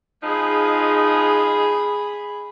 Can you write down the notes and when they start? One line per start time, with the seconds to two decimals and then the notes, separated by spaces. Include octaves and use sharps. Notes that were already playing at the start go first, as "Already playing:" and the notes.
0.23 F3 G#3 D#4 G#4 B5